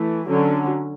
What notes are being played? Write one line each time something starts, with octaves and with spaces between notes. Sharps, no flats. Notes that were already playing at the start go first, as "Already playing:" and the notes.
Already playing: E3 A3
D3 F#3 C#4